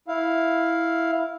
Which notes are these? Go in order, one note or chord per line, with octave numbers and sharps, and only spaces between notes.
E4 F5